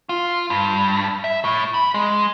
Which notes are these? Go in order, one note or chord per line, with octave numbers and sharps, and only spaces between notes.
F4
G2
E5
A2
B5
G#3